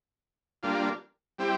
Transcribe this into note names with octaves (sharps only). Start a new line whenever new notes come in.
G3 A#3 D4 F4
G3 C4 E4 G4